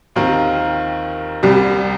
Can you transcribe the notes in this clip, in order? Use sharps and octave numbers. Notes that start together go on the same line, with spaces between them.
D#2 D#3 C4 F4 A#4
C2 C3 G3